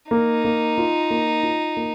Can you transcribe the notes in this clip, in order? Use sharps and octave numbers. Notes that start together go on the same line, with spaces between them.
A#3 D#4
A#3
F4
A#3
F4
A#3